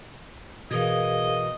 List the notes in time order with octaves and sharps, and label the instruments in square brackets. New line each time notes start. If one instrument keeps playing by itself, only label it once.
[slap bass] B2 E3 [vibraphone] G#4 A#4 F5 [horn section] D#5